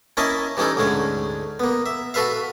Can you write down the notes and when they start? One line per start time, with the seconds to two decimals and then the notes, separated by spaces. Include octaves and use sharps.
0.17 A#3 C#4 E4 D#5 E5 A5
0.57 E3 G3 C#4 D#4 A4
0.77 D2 G#2 D3 C#4
1.60 A#3 B3
1.86 E5
2.14 F#4 A4 B4 E5 F5